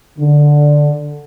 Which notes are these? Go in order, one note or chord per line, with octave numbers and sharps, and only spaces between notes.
D3